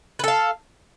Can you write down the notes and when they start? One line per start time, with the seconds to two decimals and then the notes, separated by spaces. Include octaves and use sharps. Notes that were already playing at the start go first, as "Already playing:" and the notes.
0.19 B4
0.24 A4
0.28 F5